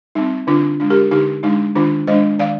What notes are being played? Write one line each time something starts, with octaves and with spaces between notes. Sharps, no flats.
G3 C4 D#4
D3 D4 F4
G#3 D4
G4 A#4
D3 D#4 G4
G#3 D4 D#4
D#3 D4 F4
G#3 D4 C5 D#5
D#3 D5 F5